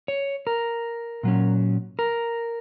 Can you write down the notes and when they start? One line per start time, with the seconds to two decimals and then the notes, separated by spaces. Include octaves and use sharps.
0.08 C#5
0.47 A#4
1.23 A#2 F#3 C#4
1.99 A#4